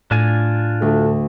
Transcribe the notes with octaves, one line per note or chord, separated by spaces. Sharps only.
A2 D4 F4 G#5
D2 A4